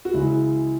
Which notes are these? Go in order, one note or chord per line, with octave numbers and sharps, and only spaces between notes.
F#4
C#2 C#3 E3 G#3 E4